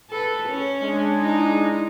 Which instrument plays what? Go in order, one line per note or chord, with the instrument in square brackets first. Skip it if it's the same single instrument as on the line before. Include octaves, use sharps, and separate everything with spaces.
[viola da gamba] A4 B4
C#4
[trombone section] G#3 D4
[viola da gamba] D#4 E4